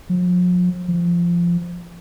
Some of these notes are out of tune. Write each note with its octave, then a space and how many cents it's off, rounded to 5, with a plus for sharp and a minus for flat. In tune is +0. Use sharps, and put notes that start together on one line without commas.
F3 +45
F3 -15